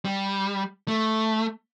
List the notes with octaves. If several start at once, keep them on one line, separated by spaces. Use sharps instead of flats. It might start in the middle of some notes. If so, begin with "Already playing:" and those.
G3
A3